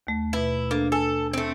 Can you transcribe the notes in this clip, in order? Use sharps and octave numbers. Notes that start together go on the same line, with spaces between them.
D#2 A3
B2 E4 B4
A#3 D4 A4
A4 G#5
A3 C4